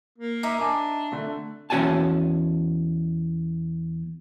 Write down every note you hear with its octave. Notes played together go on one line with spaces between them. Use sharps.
A#3
D#4 D#5 E5 D6
D4 G#5 D6
D3 A3
E2 C#4 F#4 D5 G#5 A5